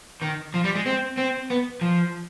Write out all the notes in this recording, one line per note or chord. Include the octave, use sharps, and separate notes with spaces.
D#3
F3
G3
G#3
C4
C4
B3
F3